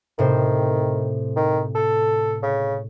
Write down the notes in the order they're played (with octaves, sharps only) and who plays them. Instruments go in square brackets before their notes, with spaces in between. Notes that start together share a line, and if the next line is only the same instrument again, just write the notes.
[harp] A2 C3 C5 [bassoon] D#3
[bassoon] D#3
A4
C#3